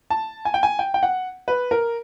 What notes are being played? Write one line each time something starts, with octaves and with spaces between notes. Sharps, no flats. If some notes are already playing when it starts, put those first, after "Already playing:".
A5
G#5
G5
G#5
G5
G5
F#5
B4
A#4